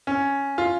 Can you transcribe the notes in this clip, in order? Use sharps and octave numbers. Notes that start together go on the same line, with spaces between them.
C#4
F4